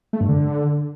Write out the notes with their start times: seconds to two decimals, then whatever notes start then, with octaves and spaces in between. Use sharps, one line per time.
0.13 A3
0.21 G2
0.29 D3